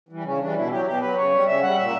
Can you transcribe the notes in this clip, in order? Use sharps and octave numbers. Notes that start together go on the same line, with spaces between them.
E3 G3
C#3 C#4
E3 G3 D4
B2 E4
F#3 G4
B2 G4
F#3 B4
C#3 C#5
G3
C#3 E5
G3 F#5
A#2 E5